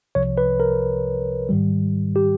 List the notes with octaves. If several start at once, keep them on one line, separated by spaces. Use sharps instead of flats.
C2 C3 F3 C#5
B4
A#4
G#2 D#3 G3
G4